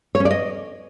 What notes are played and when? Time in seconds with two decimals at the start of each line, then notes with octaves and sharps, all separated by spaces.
0.15 C#5
0.20 C#4
0.25 D5
0.31 D#5